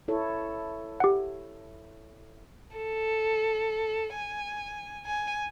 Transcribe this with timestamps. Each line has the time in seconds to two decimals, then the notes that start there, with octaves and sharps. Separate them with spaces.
0.08 E4 A4 C#5
1.00 G4 F#5
2.76 A4
4.14 G#5
5.06 G#5